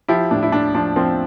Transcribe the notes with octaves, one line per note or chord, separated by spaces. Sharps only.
F3 E4 G4
A2 D4
E4
A2 D4
F3 D4
F3 C4